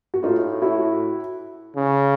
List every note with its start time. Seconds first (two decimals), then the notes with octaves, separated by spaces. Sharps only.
0.14 F#4
0.23 A2 D#4 F4
0.62 E4 F#4
1.77 C#3